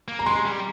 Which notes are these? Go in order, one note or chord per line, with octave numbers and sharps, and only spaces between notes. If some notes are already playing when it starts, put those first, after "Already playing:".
A#3
A#5
G#3 C6
G3